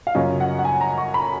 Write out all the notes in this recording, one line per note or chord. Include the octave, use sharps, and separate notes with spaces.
F5
F#2 C#3 F#3 C#4 F4 D#5
F#5
F#5
G#5
A#5
C#6
B5